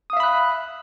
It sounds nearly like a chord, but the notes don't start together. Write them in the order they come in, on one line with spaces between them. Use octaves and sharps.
D#6 F5 E5 B5 F#6